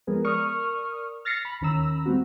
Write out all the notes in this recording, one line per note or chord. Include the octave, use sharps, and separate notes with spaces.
F3 G#3 B3 G#4 A#4
A#4 D5 C#6 D#6 F6
F6 A6 A#6 C7 C#7
B5
D#2 D#3 C#4 A#5 B5 E6
G3 A3 C4 F#4